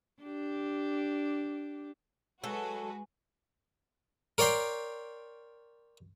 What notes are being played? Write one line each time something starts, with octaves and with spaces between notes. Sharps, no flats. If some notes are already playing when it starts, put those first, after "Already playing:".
D4 G4
F#3 G#3 F#4 A4 B4 G#5
A#4 C#5 D5 G5 C6